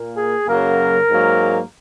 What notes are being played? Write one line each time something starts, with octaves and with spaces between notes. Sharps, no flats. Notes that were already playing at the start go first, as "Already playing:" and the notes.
Already playing: A#2 A#3
G#4
F#2 C#3 F#3 A#3 A#4
G#2 F#3 A#3